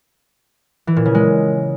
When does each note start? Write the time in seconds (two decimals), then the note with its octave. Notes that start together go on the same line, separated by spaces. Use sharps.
0.87 E3
0.96 A#2
1.06 C#3
1.15 G#3